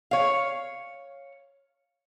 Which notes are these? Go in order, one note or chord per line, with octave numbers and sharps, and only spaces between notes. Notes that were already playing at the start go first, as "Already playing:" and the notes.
C#5 F5